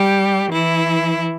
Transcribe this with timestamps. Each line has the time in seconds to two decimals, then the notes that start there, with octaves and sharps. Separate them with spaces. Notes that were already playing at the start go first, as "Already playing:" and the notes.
Already playing: G3 G4
0.51 E3 E4